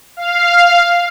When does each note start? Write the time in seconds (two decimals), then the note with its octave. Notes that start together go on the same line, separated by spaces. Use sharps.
0.17 F5